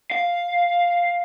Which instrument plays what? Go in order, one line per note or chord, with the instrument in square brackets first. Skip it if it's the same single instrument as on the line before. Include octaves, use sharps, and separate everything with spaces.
[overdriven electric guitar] F5